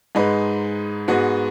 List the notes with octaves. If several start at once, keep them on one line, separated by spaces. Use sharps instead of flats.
G#2 G#3 D#4 B4
G#2 G#3 B3 F#4